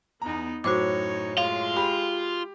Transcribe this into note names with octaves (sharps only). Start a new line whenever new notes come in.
E2 B3 D#4 A#5
F#2 A2 D#4 F#4 C5 C#5 D6
G#3 F4 F5
G4 B5